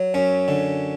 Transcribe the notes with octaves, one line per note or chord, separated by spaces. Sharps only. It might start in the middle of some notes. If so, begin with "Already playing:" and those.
Already playing: F#3
F#2 C#4
D3